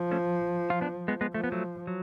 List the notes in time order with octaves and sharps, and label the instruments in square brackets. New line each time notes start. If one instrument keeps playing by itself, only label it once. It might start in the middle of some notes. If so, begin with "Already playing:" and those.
Already playing: [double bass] F3
[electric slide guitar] A3 C#4
F4
B3 D4
G#3 B3
G#3 B3
[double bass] F3 [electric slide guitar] A3
[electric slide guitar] B3
F#3 A3
F#3